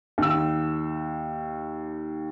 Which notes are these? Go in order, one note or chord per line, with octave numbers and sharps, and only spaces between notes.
D#2 E6